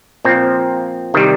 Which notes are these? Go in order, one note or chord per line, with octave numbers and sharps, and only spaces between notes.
A#2 F3 C4
C3 D#3 G3